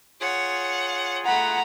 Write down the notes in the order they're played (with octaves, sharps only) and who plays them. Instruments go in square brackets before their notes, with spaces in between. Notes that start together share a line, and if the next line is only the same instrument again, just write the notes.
[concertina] F4 G#4 [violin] C#5 F#5
[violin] A3 B5 [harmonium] F#5 [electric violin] A#5